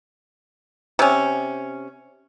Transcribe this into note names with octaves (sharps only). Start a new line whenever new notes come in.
C3 C#4